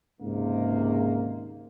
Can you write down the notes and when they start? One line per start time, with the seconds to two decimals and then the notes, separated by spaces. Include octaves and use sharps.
0.21 C#2 G#2 C3 D#3 A#3